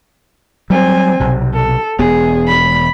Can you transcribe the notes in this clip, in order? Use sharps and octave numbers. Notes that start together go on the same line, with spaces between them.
F#3 G3 C4 G#5
B1 C3
A4
E1 B3 G#4
B5